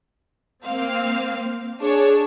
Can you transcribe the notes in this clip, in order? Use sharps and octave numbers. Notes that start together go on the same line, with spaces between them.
A#3 C4 F5
D4 G#4 C#5